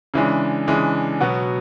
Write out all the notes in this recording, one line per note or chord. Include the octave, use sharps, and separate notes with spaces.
C#3 E3 G#3 D4
C#3 E3 G#3 D4
B2 F#3 B3 F#4